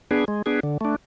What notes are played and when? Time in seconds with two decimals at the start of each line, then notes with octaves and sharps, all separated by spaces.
0.11 B3 D4 G#4
0.28 G#3
0.46 B3 D4 G#4
0.63 D3
0.81 A3 D4